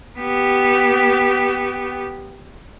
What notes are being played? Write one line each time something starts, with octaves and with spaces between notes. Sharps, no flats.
B3 G4